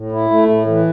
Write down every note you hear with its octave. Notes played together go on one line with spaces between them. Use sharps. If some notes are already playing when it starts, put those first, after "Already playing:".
Already playing: A2
E4
A3
A2
E3